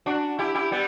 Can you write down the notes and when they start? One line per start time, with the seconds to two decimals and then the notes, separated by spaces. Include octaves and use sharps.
0.06 D4 F#4
0.39 E4 G4
0.55 E4 G4
0.71 G3 B3